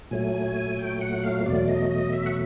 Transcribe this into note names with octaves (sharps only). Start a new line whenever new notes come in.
A#2 F#3 A3 G#5
G5
F#5
F5
E2 B2 F#3 A3 D5
D#5
D#5
E5
F#5